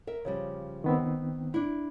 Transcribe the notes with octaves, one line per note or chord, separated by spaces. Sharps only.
A#4 E5
C#3 F3 G3
D#3 B3 C4
D4 E4